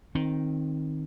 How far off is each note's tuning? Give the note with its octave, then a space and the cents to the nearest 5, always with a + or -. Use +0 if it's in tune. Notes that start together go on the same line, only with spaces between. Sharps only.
D#3 +0 C4 +15